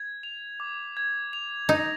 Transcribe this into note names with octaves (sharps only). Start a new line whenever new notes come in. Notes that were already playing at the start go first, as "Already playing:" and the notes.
Already playing: G#6
F7
D6
G#6
F7
D#4 A#6